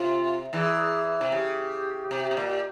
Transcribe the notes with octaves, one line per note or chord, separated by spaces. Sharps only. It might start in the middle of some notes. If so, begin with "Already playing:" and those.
Already playing: C3 F4
E2 E3 G#4
C3
C#3 G4
C3
C3
A#2